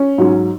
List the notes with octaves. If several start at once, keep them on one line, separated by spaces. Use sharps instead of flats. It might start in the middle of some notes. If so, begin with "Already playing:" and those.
Already playing: C#4
G#2 F#3